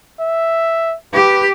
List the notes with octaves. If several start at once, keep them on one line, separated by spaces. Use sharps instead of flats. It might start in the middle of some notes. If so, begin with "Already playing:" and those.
E5
G4 B4